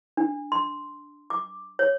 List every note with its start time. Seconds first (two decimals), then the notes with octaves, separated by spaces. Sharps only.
0.17 D4
0.52 C6
1.30 D6
1.79 C#5